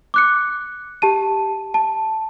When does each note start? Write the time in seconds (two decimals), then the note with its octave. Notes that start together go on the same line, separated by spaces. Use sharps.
0.14 D6 F#6 C#7
1.02 G4 A5 D#7
1.74 A5